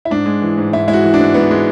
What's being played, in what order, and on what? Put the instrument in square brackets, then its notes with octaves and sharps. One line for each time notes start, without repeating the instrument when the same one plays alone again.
[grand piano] E4
G#2 D4
G#3
E3
G#2
G#2 E4
G#3 E4
F#4
E3
D4
G#2
G#2 B3
G#3